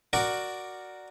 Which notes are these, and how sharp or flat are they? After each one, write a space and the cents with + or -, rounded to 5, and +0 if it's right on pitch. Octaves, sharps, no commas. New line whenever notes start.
F#4 +0 A#4 +0 D5 +5